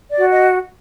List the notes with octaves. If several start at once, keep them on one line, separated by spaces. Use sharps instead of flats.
D5
F#4
D#5